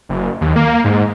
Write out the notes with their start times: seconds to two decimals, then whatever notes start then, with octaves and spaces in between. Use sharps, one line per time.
0.09 F#1
0.41 D#2
0.56 A#3
0.85 G#2